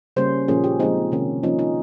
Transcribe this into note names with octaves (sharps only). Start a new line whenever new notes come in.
C#3 G3 A#3 C#4 C5
A#2 F3 A#3 C#4 G#4
G4
F3 G#3 C4 D#4
C3 D#3 A#3 C#4
F3 A#3 C#4 D#4
D#4